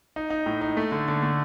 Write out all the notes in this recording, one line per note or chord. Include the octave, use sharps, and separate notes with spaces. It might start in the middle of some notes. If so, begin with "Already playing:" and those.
D#4
D#4
A2
D#4
A3
D3
D3
A3